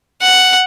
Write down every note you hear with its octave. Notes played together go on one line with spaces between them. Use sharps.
F#5